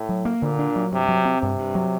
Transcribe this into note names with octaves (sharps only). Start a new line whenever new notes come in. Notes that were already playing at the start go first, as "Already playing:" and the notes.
Already playing: A2
F#3
A#3
A#2 D3
D4
F#3
G2 C3
F#3
C4
G2 C3
G2
F#3